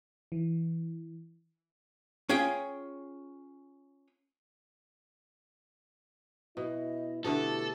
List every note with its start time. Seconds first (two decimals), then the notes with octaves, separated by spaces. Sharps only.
0.32 E3
2.29 C#4 F4 G#4 G5
6.57 B2 E4 D#5
7.25 B2 D3 A3 E4 G4 A4